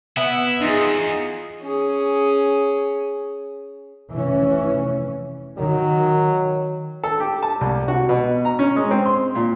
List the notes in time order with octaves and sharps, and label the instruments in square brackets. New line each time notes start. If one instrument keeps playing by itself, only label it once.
[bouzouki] B3 E5 [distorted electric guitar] E4
[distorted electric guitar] E2 [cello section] D#4 F4 G#4
[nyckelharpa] C#4 G#4
[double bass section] F1 E3 C#4
[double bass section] D#3 [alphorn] F#3
[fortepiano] A4
G4
A5
C2
F#4
B2
A#5
C#4
G#3
C4
C6
A#2